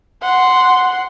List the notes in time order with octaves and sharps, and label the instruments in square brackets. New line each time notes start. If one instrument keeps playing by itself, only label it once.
[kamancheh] F#5 C6